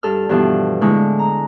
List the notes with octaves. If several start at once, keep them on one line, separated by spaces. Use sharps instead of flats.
G2 A4 F6
G2 B2 E3 F3
A2 D3 G#3 E4 C#6
A#5